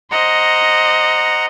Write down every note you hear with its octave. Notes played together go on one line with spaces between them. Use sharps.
C5 D#5 F#5 A#5